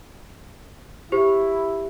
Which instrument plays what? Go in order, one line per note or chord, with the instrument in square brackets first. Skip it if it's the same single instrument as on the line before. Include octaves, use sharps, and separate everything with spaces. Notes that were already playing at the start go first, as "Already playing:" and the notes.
[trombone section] E4 [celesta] G4 C5